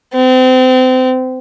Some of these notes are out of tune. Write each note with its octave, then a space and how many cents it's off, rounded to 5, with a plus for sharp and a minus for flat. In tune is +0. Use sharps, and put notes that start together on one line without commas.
C4 -30